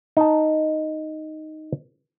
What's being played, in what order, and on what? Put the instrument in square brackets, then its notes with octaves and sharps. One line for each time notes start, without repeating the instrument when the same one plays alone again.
[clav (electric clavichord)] D#4 A5